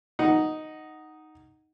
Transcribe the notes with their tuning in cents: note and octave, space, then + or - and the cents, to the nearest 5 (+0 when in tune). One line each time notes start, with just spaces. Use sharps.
D#4 +0 F#5 +5